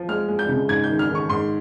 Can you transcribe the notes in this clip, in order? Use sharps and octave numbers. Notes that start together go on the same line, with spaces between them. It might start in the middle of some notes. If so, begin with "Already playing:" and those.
Already playing: F3
G#3 F6
G#3
G6
C#3
G#2 G#6
G6
D#3
F6
D#3
C#6
G#2 C6